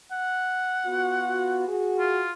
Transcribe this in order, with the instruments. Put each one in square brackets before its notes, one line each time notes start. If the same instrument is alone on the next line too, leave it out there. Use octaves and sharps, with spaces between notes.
[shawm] F#5
[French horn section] B3 F4 F#4
F#4 G#4
[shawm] F4